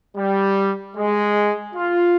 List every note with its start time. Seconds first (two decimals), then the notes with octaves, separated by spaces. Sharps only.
0.17 G3
0.96 G#3
1.75 F4